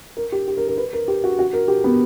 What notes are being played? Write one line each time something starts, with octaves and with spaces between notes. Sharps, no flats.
A#4
G4
G4
A#4
A#4
B4
A#4
G4
F#4
F#4
A#4
G4
B3